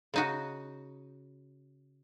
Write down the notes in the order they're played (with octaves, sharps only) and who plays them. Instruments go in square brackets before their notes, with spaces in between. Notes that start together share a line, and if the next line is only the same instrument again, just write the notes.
[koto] C#3 D#4 F#4